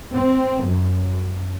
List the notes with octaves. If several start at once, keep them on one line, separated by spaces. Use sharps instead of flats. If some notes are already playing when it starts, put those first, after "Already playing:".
C4
F#2